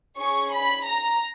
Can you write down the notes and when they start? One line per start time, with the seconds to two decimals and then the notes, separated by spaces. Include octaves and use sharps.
0.18 C#4 G#4 C#6
0.52 B5
0.86 A#5